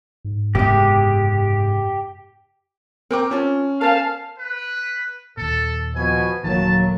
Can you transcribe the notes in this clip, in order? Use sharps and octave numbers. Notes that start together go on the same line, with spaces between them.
G#2
F#1 F#2 C3 G#3 B3 G4
C4 A#4 G5 A#5 D6
C#4 F4 A5
A#4 C5 F5 G#5 A5
B4
D#2 A#2 A4
B2 F3 G#5
D#1 A#1 D#3 F#3 A3 A#3 A5